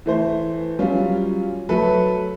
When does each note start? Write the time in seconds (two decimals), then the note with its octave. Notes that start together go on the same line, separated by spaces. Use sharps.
0.06 E3 A3 C5
0.79 F#3 G3 C#4 F4
1.69 F#3 A3 A4 B4